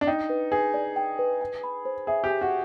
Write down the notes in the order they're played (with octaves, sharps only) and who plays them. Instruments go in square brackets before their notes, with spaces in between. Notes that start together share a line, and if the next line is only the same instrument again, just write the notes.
[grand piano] D4
[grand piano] D#4 [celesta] G5
[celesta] B4
[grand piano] G#4 [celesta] B4
[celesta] D5
G5
B4
G#5
B5
C5
[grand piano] G#4 [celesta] E5
[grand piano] G4
[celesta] G#5
[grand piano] F#4